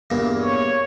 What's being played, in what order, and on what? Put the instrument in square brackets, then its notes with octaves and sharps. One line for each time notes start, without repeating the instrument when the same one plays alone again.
[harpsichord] E2 G2 A#2
[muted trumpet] C#5